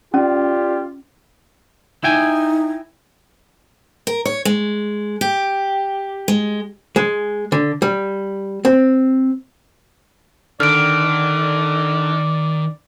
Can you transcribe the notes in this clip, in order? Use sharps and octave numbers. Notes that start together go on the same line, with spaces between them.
C#4 F4 G4 D5
D#4 E4 G5 G#5
A#4
C#5
G#3
G4
G#3
G#3
D3
G3
C4
D3 D#3 D5 F6 D7